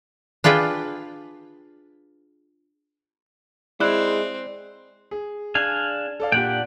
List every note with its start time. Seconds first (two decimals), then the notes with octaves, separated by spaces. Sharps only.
0.44 D4 F4 G#4 B4 G5
3.80 G#3 C4 E4 D5 F#6
5.11 G#4
5.55 D4 F5 G#5
6.20 A4 D5 F5
6.32 A#2 D4 G4 F#5 G5